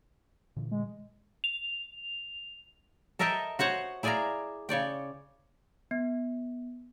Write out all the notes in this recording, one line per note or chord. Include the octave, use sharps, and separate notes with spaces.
A#2 D3 E3
G#3
F7
A4 A#4 D#5 E5 G5 A5
F#4 C5 C#5 F#5
E4 G#4 D5 E5 F5 A#5
C#3 C#5 D5 G5
B3